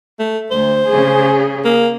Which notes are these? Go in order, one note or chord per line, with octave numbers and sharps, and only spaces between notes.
A3
D2 C5
C#3 G#4
A#3